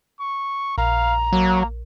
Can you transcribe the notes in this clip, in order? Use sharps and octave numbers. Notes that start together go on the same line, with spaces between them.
C#6
A#1 F5 A#5
F#3 A#3